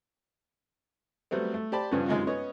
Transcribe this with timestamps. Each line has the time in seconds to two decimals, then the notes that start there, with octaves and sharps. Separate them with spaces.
1.31 F#3 G3 A3 B3 C4
1.54 A3
1.72 G4 C5 D5 A5 B5
1.91 G2 C#3 F3 G3 B3 C#4
2.08 F#2 C3 G#3 C#4 D#4 F4
2.27 B3 C#4 C#5 D#5